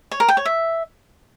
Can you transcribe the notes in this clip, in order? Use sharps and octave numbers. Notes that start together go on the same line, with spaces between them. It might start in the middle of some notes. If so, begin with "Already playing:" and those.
C#5
A#4
G5
C#5
E5